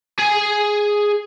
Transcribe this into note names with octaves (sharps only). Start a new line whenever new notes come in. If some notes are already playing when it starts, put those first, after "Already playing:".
G#4 G#5